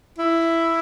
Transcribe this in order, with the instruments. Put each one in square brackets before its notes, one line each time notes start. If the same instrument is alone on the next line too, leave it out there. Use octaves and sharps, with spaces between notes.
[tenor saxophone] E4